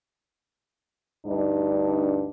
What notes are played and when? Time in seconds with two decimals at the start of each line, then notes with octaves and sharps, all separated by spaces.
1.25 D2 G2 D4 D#4